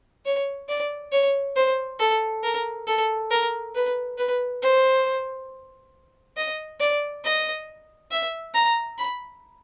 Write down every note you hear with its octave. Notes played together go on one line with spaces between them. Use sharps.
C#5
D5
C#5
C5
A4
A#4
A4
A#4
B4
B4
C5
D#5
D5
D#5
E5
A#5
B5